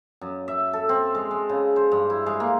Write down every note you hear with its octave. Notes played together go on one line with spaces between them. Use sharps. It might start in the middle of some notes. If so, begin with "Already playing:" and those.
F#2
E5
A4
C4
G#3
G#3
C#3
C5
G2
E4
G#3
A#3